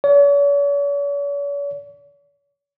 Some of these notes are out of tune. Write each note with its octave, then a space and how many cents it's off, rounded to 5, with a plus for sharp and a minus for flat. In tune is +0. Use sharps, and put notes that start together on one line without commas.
C#5 +45